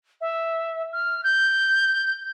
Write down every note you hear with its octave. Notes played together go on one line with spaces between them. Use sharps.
E5
F6
G6